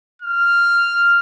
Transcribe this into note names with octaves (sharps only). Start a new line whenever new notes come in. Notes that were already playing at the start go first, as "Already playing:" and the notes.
F6